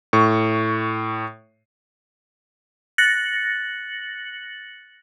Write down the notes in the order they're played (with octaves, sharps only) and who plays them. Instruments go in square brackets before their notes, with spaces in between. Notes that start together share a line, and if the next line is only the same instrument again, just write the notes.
[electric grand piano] A2 C#6
[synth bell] F#6 A6 A#6 C#7 F#7